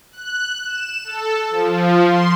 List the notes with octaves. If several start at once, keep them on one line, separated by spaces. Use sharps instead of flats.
F#6
E7
A4
F3
C6